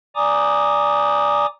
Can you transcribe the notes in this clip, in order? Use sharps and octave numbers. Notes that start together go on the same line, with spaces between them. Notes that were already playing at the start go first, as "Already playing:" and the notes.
D5 G#5 A#5 D6 D#6